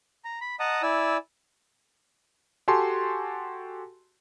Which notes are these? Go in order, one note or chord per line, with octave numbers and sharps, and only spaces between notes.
A#5
B5
D#5 F#5 A5 A#5 D#6
E4 D5 G#5 E6
F#4 G4 A4 G#5 A5 C6